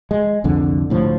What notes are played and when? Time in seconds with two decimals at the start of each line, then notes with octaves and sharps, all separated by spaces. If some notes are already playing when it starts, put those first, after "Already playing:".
0.11 G#3
0.44 C2 F2 D3
0.90 D2 A2 F3